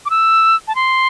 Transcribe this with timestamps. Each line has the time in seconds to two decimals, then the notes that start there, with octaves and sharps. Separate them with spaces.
0.06 D6
0.10 E6
0.68 A5
0.75 C6